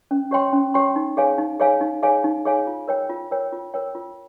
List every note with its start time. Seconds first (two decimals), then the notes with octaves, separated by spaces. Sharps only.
0.11 C#4
0.31 G4 C#5 G5 C6
0.53 C#4
0.74 G4 C#5 G5 C6
0.96 D#4
1.17 G#4 C#5 F5 G#5
1.38 D#4
1.60 G#4 C#5 F5 G#5
1.81 D#4
2.03 G#4 C#5 F5 G#5
2.24 D#4
2.45 G#4 C#5 F5 G#5
2.67 F4
2.88 A#4 C#5 G5
3.09 F4
3.31 A#4 C#5 G5
3.52 F4
3.74 A#4 C#5 G5
3.95 F4